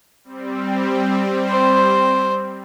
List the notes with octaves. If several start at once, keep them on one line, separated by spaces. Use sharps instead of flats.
G3 C4
C5